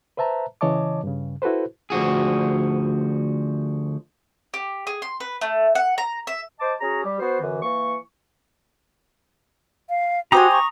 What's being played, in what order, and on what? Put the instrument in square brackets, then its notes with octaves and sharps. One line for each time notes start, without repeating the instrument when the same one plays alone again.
[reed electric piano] B4 C5 E5 A5 A#5
C#3 E3 C#5 D#5 A5 D6
G2 C#3
E4 F#4 A4 B4 C5
[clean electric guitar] D2 F3 F#4 G#4
[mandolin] G4
G#4
C6
B4
A3
F#5
A#5
E5
[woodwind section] C5 D#5 A5 D6
C#4 F#4 G#4 A#5
G3 G4
B3 F#4 C5
F#2 D3 E3
E3 A#3 C#6
[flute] F5
[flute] F#4 [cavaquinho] G4 C5 G#5 [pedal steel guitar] A#5 D#6
[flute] C#6